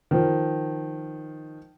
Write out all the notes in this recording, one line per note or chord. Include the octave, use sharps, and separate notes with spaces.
D#3 F3